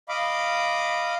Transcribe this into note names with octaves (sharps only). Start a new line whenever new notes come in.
D#5 F5 B5 D6